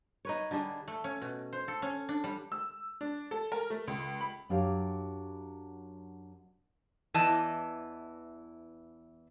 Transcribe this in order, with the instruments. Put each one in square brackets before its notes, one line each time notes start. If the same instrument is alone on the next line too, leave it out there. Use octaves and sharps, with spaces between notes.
[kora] D#4 B4 C#5
D3 G3 D4 G#4
[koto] A3
C#4
B2
C5
A4
C#4
D4
G3
[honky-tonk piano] E6
D4
A4
A#4
A3
C#2
B5
[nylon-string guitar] F#2 F#3 D4 G4 C#5 F5
[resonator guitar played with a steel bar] E2 E3 D5 D#5 A5